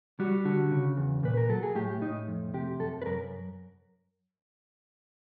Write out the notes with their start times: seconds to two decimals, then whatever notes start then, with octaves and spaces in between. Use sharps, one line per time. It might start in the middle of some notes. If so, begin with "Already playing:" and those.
0.20 G3 F#4
0.45 D3 F#4
0.71 C#3
0.97 E2
1.23 A#2 B4
1.37 A#4
1.49 F#3 A4
1.63 G#4
1.75 A2 G4
2.02 A2 D#4
2.28 F2
2.54 C3 G4
2.79 F#2 A4
3.02 B4
3.06 F#2 A#4